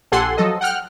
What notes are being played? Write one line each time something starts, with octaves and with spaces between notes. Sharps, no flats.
A#1 G4 A4 F#5 G#5 C6
F3 F#3 A4 D#5
F#5 G5 F6 F#6